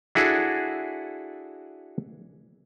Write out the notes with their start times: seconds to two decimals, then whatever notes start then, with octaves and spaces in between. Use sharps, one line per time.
0.15 D4 E4 F#4 G#4 A4